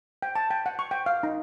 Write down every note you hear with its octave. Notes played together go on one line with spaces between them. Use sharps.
G5
A5
G5
F#5
C#6
G5
F5
D#4